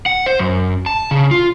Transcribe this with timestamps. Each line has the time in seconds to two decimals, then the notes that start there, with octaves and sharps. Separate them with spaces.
0.06 F#5
0.26 C5
0.39 F#2
0.86 A5
1.11 C#3
1.31 F4